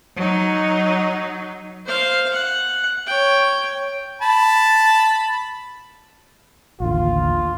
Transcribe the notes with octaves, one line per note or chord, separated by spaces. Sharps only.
F#3 D#4
C5 F5
F#5
C#5 G5
A5 B5
A1 D#2 D3 F4